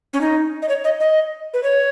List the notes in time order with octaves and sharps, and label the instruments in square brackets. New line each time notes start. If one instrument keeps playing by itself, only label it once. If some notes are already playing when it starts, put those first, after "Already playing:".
[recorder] C#4
D#4
D#5
C#5
D#5
D#5
B4
C#5